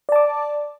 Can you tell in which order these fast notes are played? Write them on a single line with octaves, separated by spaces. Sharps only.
D5 A5 D6